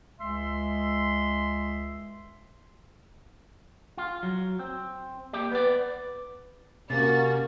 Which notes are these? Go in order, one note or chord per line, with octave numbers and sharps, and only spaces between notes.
C#2 G#3 E5 C6
F4
F#3
C4
A#3 G4 D5
B3 B4 D5
C3 A#3 C#4 F#4 A6